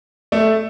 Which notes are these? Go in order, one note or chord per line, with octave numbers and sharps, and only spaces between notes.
A3